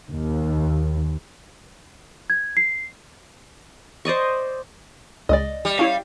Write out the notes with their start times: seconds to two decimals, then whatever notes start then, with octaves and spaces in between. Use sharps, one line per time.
0.12 D#2
2.30 G#6
2.57 C7
4.05 C5 D5 D#5 C#6
5.29 C#2 G#3 D5 D#5
5.65 G3
5.79 C#4 E4 C#5 F5